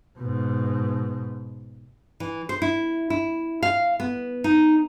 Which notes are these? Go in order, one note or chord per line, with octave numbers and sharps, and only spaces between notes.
G#2 B2
E3
C5
E4
E4
F5
B3
D#4